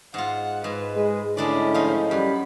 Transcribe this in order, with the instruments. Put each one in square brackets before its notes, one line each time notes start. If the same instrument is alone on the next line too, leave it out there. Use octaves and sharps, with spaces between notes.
[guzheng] G#2 F4 [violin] F#5
[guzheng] G#2 [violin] B4
[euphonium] G#3
[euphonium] A2 [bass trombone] D3 [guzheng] G#3 D4 D5 [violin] C#4 E4
[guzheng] F3 D#4 F4
[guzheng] F#2 [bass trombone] G3 [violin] B5